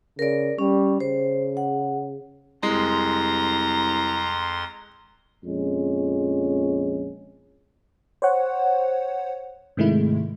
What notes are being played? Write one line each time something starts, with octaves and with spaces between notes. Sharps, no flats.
C#3 A#4 D5
G3 C#4
C#3 C5
F#5
C2 F2 G#3 A#5 C6
A#1 F2 G#3 C#4
C5 C#5 F#5
G#2 C3 D#3 G#3 A3 E4